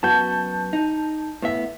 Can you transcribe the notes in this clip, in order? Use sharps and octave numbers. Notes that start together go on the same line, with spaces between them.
F#2 B3 F#4 A5 G6
D#4
A2 B3 E5